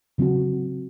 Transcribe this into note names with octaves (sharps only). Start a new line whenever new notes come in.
C#3 F#3 C4 F#4